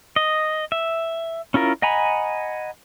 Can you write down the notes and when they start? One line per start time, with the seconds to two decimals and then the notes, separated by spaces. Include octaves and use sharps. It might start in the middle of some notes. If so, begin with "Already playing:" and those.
0.16 D#5
0.72 E5
1.54 C#4 E4 F4 A#4
1.82 D#5 F#5 G#5 A#5 B5